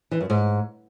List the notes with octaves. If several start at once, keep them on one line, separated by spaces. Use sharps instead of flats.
E3
F#2
G#2